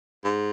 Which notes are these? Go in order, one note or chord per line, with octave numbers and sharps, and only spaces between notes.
G#2